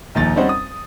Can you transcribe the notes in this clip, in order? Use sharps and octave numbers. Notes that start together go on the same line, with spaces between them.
A#1 D#2 A6
G3 C4 C#4 D#4 C5 F#5
D#6